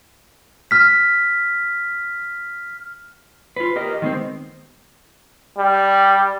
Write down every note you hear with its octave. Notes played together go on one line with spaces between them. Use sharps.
F6 B6
F4 B4
G4 A#4 D#5
D#3 G#3 B3 C4
G3